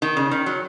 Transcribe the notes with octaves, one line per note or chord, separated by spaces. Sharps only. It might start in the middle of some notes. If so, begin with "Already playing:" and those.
D#3
C#3
D#3
F#3